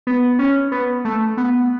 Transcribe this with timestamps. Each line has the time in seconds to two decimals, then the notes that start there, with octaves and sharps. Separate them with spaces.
0.07 B3
0.39 C#4
0.72 B3
1.05 A3
1.37 B3